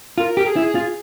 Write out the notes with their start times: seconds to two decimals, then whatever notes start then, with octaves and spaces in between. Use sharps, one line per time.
0.18 F4 A#4
0.37 G4
0.46 G#4
0.56 E4
0.75 F4